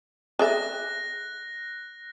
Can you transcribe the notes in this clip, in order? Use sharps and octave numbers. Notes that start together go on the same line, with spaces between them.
G#4 D5 E5 F#6 A#6